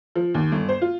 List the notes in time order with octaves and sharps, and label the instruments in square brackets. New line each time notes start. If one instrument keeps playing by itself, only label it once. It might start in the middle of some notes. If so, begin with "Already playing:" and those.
[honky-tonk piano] F3
D#2
G1
C5
F4